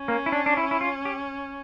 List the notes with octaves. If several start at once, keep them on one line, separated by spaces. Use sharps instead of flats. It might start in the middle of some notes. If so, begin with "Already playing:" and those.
Already playing: C#4
A#3
E4
D4
D4
E4
E4
F4
G4